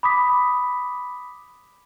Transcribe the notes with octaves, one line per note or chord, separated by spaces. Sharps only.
B5 D6 D#6 B6